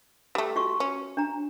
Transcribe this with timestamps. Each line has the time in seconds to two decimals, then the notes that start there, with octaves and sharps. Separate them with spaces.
0.35 G3 A3
0.56 F4 F#4 C#6
0.80 C#4
1.17 D4 A#5